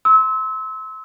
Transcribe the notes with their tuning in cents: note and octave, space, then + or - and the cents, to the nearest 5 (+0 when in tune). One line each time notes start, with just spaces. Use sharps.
C6 +0 E6 -30